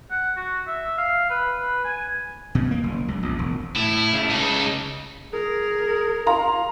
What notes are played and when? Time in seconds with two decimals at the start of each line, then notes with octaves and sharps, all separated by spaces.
0.11 F#5
0.37 F#4
0.67 E5
0.98 F5
1.30 B4
1.60 B4
1.84 G#5
2.55 B2
2.71 A#3
2.83 F#1
3.08 C#2
3.23 A#1
3.39 E1
3.76 A2 E4
4.13 C#3 A3
4.31 C#2 C#3 D#4 A4
5.33 G#4 A#4
6.26 F5 A#5 C6